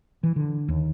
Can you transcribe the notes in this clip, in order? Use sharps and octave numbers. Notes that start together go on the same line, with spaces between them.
E3
D3
D#2